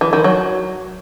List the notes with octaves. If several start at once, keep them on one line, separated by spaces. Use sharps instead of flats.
E3
D#3
F#3